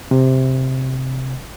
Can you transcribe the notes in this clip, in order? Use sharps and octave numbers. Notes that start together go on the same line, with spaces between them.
C3